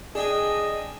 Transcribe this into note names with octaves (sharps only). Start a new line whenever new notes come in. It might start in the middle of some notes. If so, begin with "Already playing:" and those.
D4 G#4 D#5 G5 G#5